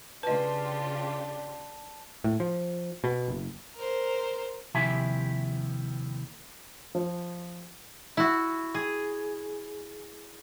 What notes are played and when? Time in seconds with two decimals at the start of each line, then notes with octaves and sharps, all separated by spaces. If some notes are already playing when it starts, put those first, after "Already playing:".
0.23 C#3 D4 F4 G4 B4 D#5 A5
2.24 A2
2.40 F3
3.04 B2
3.28 F#1
3.76 A#4 C5
4.75 D#2 C3 F3 E4 E5 G#5
6.95 F3
8.17 E4 F#4
8.74 G#4